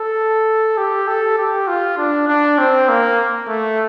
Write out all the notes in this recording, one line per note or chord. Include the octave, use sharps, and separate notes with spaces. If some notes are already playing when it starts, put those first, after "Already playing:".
Already playing: A4
G4
A4
G4
F4
D4
D4
C4
A#3
A3